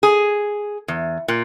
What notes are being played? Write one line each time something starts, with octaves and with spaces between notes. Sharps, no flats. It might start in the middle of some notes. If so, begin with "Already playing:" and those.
G#4
E2
A#2